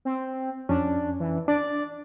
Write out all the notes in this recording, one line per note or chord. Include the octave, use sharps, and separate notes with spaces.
C4
F2 C#4 D4
E3
D4 D5